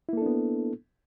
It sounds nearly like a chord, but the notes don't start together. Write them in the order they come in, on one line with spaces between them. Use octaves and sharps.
E4 A#3 A4 D4 B3